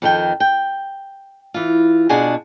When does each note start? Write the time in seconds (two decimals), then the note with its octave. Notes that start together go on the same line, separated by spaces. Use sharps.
0.02 F2 D#3 G5
0.40 G5
1.54 E3 F4
2.09 B2 D4 F4 F#4 G#4 G#5